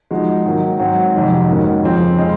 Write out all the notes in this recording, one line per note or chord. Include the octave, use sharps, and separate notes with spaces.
F3 G#3 D#4 F#4
G#2 D#3 F#3 A#3
G#2 F#3 C4 F#4
F2 C3 D#3 F#3
G#2 D#3 A#3 C#4 F#4
F2 C#3 F3 C4
C#3 G#3 C4